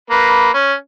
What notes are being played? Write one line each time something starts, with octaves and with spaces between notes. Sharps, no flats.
A#3 B4
C#4